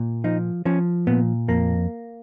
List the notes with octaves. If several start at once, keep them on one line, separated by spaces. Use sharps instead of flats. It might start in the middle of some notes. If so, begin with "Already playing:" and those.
Already playing: A#2
F3 D#4
F3 C#4
A#2 B3
F2 A#3